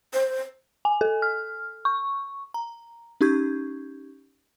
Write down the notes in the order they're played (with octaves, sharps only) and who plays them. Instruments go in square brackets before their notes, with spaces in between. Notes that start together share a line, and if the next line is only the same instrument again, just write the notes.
[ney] C5
[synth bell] G#5
A4
F6
C#6
A#5
C#4 D#4 G4 C#6 G6 G#6